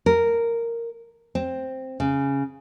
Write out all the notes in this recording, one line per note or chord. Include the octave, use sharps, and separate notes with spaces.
A#4
C4
C#3